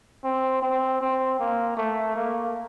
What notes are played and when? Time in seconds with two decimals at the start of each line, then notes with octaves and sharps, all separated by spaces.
0.24 C4
0.62 C4
1.01 C4
1.40 A#3
1.77 A3
2.16 A#3